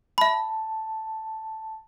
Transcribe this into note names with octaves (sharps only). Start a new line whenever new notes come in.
E5 A5 B5